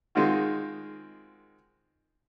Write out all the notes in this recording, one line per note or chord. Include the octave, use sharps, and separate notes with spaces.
D#3 G#3 C4 F4 F#4